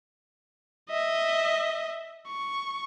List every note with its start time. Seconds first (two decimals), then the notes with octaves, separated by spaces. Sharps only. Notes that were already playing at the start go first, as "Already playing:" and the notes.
0.90 D#5 E5
2.27 C#6